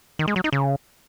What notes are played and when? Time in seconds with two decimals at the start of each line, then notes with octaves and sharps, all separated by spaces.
0.19 D#3
0.28 G#3
0.36 F#3
0.44 D#4
0.53 C#3